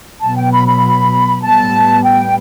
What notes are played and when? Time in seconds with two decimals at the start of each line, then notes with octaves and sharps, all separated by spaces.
0.21 B2 F#3 B3 A5
0.36 G5
0.51 B5
0.67 B5
1.41 A2 G3 B3 A5
2.02 G5